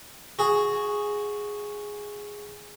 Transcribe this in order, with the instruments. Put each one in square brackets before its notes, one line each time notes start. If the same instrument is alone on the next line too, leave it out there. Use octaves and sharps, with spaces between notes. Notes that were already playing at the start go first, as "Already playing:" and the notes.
[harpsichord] F#4 G#4